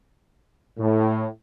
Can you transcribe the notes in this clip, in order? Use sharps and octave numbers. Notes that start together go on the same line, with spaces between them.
A2